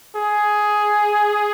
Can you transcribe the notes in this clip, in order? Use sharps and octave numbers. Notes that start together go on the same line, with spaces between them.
G#4